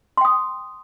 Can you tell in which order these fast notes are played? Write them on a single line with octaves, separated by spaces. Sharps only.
C6 G5 D#6